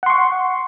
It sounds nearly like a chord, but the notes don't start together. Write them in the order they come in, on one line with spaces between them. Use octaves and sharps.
F#5 C6 C#6